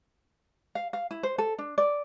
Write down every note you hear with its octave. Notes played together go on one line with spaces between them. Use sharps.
F5
F5
E4
C5
A4
D4
D5